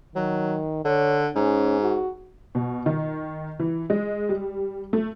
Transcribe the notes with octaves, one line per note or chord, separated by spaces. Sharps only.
D#3 F#3
D3 C#5
G#2 C#4
F#4
B2
D#3
E3
G#3
G3
A3